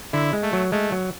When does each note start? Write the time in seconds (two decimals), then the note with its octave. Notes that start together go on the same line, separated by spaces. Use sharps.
0.13 D3 E4
0.33 G#3
0.43 A3
0.53 F#3
0.72 G#3 A3
0.92 F#3